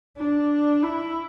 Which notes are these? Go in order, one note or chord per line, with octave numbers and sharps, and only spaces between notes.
D4
E4